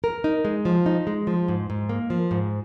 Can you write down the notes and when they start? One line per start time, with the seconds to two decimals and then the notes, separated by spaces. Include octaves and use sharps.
0.04 A#4
0.24 D#4
0.45 G#3
0.65 F3
0.86 D#4
1.07 G#3
1.27 F3
1.48 G#2
1.70 G#2
1.89 A#3
2.10 F3
2.31 G#2